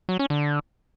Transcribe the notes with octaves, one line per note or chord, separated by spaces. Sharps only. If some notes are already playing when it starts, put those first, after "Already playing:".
F#3
C#4
D3